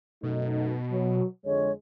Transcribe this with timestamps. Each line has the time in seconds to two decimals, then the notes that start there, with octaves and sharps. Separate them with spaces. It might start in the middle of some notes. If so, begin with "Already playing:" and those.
0.23 F#2 B2 A3 D#4
0.91 F#3
1.45 F2 D3 G#3 C#5